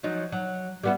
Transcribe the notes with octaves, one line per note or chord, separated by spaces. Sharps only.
F3 F#3 D#4
F#3
G3 B3 E4